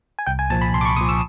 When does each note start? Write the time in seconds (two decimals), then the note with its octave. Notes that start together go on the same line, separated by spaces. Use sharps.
0.19 G#5
0.27 C2 G5
0.39 G#5
0.50 A#2 F3 A5
0.61 B5
0.73 C2 C6
0.81 D6
0.85 C#6
0.96 A#2 F3 D#6
1.09 E6